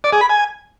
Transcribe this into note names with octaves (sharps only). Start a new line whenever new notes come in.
D5
G#4
B5
G#5